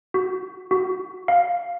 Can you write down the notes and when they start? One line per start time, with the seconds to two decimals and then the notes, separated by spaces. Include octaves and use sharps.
0.14 F#4
0.71 F#4
1.28 F5